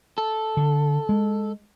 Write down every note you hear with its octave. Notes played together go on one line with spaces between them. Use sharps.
A4
D3
G#3